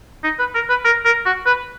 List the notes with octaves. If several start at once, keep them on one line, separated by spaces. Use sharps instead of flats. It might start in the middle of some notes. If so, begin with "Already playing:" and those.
D#4
B4
A#4
B4
A#4
A#4
F#4
B4